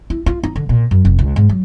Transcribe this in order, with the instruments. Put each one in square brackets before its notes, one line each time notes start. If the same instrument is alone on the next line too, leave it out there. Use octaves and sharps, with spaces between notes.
[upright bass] E4
F4
D#4
D3
A#2
F#2
F1
C#2
G#2
F#3